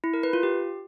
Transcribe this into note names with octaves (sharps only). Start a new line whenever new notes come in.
E4
A#4
B4
F4
G4